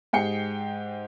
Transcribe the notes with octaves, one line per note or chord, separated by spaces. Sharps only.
G#2 G4 G#4 G5 C7 C#7